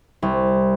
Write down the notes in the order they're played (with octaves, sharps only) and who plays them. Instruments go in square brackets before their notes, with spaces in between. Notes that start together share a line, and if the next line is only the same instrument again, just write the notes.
[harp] C2